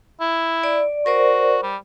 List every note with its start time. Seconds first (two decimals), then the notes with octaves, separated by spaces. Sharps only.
0.21 E4
0.63 D5
1.06 F#4 A#4 C5 D5
1.63 G3